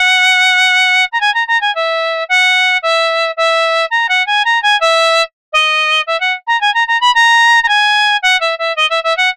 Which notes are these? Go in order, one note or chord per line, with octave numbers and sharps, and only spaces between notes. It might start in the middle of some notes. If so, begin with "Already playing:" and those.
Already playing: F#5
A#5
G#5
A#5
A#5
G#5
E5
F#5
E5
E5
A#5
F#5
G#5
A#5
G#5
E5
D#5
E5
F#5
A#5
G#5
A#5
A#5
B5
A#5
A#5
G#5
F#5
E5
E5
D#5
E5
E5
F#5